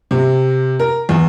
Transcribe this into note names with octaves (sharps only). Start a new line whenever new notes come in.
C3
A#4
E2